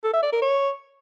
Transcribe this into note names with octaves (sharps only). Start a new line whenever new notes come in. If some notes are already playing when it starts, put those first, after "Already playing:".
A4
E5
D5
A#4
C#5